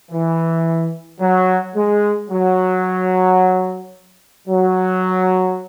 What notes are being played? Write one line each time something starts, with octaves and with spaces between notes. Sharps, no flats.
E3
F#3
G#3
F#3
F#3